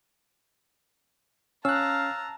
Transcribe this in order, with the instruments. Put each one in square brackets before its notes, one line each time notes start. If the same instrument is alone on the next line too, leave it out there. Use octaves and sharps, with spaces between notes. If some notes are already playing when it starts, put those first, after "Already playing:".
[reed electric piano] C#4 [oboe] F5 [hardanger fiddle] A5 A#5 [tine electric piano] E6 F#6